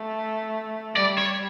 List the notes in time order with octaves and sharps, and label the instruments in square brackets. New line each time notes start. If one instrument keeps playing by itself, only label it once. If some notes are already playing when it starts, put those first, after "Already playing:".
Already playing: [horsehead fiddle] A3
[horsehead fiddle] G3 [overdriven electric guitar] D5
[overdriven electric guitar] C#5